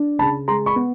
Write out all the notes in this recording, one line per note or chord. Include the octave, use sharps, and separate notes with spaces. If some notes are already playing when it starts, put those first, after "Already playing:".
Already playing: D4
C#3 A5 B5
G#3 A#5 C6
B5 C#6
B3